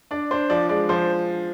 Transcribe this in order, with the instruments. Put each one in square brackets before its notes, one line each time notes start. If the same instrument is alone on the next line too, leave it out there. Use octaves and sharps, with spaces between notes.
[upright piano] D4 [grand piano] D5
[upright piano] D4 [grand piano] C5
[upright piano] F3 [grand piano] D5
[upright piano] G#3 [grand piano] D5
[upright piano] F3 [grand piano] C5